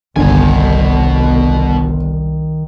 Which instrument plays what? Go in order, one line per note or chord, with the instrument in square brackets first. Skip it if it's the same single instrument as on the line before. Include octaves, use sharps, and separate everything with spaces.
[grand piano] G1 [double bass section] C2 [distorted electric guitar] B2 G#5 [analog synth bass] D#3